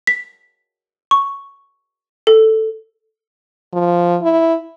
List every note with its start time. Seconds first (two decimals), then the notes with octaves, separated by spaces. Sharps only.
0.07 B6
1.11 C#6
2.27 A4
3.73 F3
4.22 E4